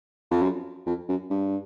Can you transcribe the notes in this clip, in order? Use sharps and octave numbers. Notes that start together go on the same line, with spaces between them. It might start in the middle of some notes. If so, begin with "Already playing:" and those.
F2
F#2
F2
F#2
G2